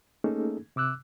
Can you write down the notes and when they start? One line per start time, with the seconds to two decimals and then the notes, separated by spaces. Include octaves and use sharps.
0.24 A3 A#3 C#4 D#4 G#4 A4
0.76 C3 D6 E6 F#6